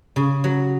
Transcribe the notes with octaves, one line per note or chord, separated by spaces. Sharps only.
C#3
F#3